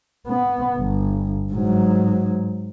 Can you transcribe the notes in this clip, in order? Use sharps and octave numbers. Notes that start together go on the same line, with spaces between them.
B3
G1
G#2 F#3